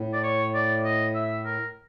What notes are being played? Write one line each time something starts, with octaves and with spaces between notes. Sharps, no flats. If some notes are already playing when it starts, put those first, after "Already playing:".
Already playing: A2
D5
C#5
D5
D#5
E5
A#4